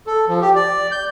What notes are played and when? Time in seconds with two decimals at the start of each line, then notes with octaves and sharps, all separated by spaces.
0.07 A4
0.28 F3
0.41 G4
0.55 D5
0.92 G6